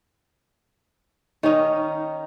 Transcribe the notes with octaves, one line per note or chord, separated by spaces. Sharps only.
D#3 C#4 D#4